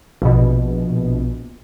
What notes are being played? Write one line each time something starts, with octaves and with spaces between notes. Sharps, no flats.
A#1 B2